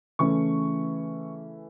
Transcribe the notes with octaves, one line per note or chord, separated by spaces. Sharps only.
C#3 E3 A3 C#4 E4 C#6